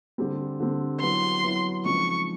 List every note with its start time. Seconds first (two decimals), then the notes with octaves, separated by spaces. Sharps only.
0.18 D3 G3 C4
0.60 D3 G3 C4
1.01 F#3 B3 E4 C6
1.43 F#3 B3 E4
1.85 C#3 F3 G#3 C4 D#4 C#6